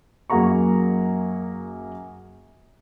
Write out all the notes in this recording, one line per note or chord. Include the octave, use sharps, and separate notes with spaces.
F#2 A#3 F#4 G#4 A#5 C#6